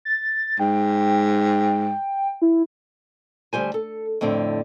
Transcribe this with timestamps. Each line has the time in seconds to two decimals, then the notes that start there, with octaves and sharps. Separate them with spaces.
0.05 A6
0.60 G#2 G5
2.42 E4
3.53 D2 G3 C5 G#5
3.74 A4
4.21 F2 A2 D3 C4